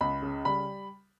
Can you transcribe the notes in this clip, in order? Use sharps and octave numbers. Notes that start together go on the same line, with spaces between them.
C#2 B5
C#3
G3 B5